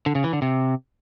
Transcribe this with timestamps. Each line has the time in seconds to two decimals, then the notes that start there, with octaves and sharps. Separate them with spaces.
0.06 D3
0.15 C#3
0.24 E3
0.33 D3
0.42 C3